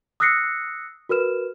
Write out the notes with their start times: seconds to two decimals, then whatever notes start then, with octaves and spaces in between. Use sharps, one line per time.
0.20 D#6 E6 F#6 A#6 C7 C#7
1.09 F#4 A#4 B4 F6 E7